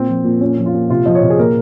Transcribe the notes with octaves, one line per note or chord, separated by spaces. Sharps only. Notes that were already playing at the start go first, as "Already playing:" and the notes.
Already playing: A#2 C4
F3
A#2
A#2 C#4
F3
F4
A#2
C3 F4
F3 D#5
C#5
C3
G#4
A#2 A#4